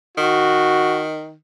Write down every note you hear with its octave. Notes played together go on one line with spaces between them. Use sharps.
D#3 F#4